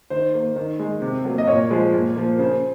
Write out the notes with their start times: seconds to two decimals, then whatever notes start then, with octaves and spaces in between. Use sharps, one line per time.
0.10 D#3 C5
0.34 A#3
0.56 D#3
0.79 G#3
1.02 C3
1.25 F#3 A#3
1.38 D#5
1.47 A#2 C#5
1.71 F3 G#3
1.94 A#2
2.16 F3 A#3
2.39 C#3 C5